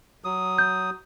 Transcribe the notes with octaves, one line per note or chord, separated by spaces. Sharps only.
F#3 D#6
G6